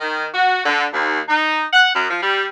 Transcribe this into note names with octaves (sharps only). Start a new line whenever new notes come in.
D#3
F#4
D3
D#2
D#4
F#5
F#2
F3
G3